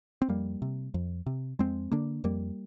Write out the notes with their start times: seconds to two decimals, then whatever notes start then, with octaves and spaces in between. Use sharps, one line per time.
0.22 C4
0.29 F2 G3 A#3
0.62 C3
0.94 F2
1.26 C3
1.59 F2 G#3 C4
1.92 D3 A#3 D4
2.24 F2 G3 A#3